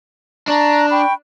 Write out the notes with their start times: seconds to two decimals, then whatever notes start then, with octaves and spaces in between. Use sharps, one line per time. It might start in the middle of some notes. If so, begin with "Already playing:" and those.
0.48 D4 A5 A#5 C#6
0.90 G5 B5 C#6